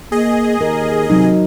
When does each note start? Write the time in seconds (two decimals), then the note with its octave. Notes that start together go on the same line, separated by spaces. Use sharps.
0.12 A#3 G#4 D#5
0.61 D#2 A#4
1.10 C3 F#3 D#4